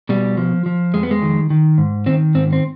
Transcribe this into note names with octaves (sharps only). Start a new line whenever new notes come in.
B2 G3
F3
F3
F2 G#3
B3
G#3
D#3
D#3
G#2
D#3 C4
G#2 C4
C4